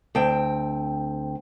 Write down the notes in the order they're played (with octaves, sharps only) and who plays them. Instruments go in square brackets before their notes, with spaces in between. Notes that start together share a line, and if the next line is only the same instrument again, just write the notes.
[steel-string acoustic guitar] D2 C4 G5